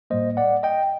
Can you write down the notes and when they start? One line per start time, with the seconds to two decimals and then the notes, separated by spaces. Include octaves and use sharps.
0.10 A2 G3 A#3 C5 D#5
0.37 D5 F#5
0.63 D#5 G5